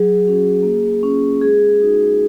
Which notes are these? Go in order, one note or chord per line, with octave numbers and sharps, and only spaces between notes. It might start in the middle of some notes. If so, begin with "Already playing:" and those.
Already playing: F#3 G#4
C#4 F#4
A#3
C#4 F4
G#3 G#4
D#4 F#4